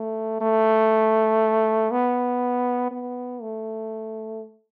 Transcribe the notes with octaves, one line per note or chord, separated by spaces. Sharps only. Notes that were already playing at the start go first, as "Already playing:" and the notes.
Already playing: A3
A3
B3
B3
A3